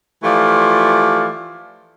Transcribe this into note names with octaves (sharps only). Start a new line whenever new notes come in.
E3 F3 A3 F4 G4 D5